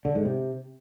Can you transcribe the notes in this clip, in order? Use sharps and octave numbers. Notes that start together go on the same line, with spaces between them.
D3
G#2
C3